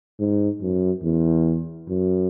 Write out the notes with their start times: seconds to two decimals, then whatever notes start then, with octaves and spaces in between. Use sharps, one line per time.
0.19 G#2
0.62 F#2
1.04 E2
1.89 F#2